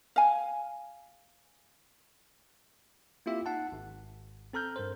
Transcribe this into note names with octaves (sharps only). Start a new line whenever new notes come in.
F5 G#5
A#3 C4 E4 F4 G4 E5
D#4 F#5 A5
G#1
C4 A4 A#5 F6 G6
G2 A#4 C5